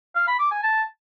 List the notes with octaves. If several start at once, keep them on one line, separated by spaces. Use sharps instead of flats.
F5
B5
D6
G#5
A5